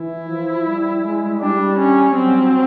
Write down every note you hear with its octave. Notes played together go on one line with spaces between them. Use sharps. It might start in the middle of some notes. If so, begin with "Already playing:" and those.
Already playing: E3 E4
F3
G3
G#3
G3 D4
C#4
F#3 C4